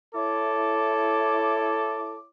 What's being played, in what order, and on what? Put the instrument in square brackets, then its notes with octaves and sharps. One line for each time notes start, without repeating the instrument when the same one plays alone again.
[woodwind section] E4 C#5 D6 [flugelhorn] A4